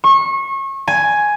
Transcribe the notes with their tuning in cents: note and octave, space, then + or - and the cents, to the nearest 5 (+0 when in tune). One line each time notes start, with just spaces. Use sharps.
C#6 -30
G#5 +5